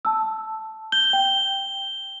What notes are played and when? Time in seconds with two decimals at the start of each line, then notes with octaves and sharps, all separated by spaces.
0.05 A5 E6
0.92 G6 G7
1.13 G5